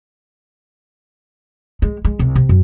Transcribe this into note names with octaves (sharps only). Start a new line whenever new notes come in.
G#3
G#3
C2
C3
F#2